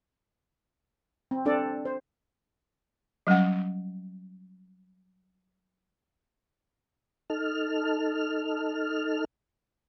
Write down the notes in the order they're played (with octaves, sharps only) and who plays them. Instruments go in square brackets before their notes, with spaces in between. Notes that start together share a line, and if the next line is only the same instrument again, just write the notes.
[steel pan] C4
C4 D4 A4 D5
C5
[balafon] F#3 G3 C#4 F#5
[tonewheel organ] D#4 A4 F6